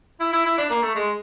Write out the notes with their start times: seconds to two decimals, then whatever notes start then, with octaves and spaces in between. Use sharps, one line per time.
0.20 E4
0.33 E4
0.45 E4
0.58 D4
0.70 A#3
0.82 A3
0.95 G#3